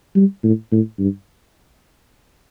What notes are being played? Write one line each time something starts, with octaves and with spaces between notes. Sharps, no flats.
G3
A2
A2
G2